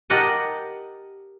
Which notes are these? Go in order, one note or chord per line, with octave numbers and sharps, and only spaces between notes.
G4 A#4 D#5 F#5 A5